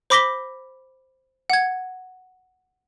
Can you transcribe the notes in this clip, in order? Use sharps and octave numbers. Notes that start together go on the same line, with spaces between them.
C5 B5 D6 A#6 B6 G7
F#5 G#6